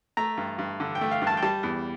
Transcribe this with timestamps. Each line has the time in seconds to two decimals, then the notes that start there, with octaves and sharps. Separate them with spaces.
0.17 A3 A#5
0.37 G2
0.58 G2
0.80 D3
0.95 G5
1.01 A3
1.11 F5
1.21 G2
1.27 A5
1.37 G5
1.42 G3 A5
1.63 E2